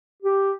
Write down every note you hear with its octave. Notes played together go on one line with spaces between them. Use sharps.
G4